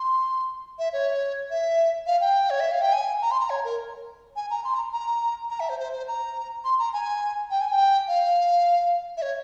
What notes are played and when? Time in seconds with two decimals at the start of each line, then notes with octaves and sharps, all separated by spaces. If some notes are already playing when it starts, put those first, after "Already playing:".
Already playing: C6
0.79 E5
0.93 C#5
1.50 E5
2.07 F5
2.21 G5
2.50 C#5
2.60 E5
2.71 F5
2.81 G5
2.93 G#5
3.22 A#5
3.31 C6
3.40 A#5
3.50 C#5
3.64 A#4
4.36 G#5
4.51 A#5
4.64 C6
4.74 A#5
4.93 A#5
5.50 A#5
5.60 E5
5.69 C5
5.79 C5
5.93 C5
6.08 A#5
6.65 C6
6.79 A#5
6.93 G#5
7.51 G5
7.61 G#5
7.71 G5
8.08 F5
9.17 E5
9.22 C#5